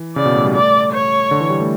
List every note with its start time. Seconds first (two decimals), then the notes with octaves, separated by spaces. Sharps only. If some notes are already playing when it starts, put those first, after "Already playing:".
Already playing: E3
0.16 C#3 D5
0.26 B2
0.35 A2
0.45 G3
0.54 A3 D5
0.93 C#5
1.31 D3
1.41 E3
1.50 G3
1.60 A3